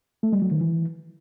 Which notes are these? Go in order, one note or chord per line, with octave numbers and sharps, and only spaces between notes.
A3
G3
F#3
D#3
E3